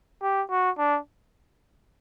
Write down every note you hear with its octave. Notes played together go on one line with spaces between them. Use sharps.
G4
F#4
D4